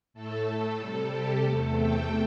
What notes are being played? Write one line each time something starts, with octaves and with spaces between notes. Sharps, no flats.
A2 A3 A4
C3 G3 A4
G4
E2 C3 A3 A4
G5